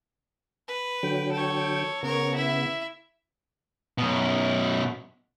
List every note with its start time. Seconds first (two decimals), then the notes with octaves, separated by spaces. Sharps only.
0.68 B4
1.03 D3 F#3 G5
1.32 A4 C#5
2.03 C#3 B3 A#4 C#5
2.35 E4 E5
3.98 F#2 B2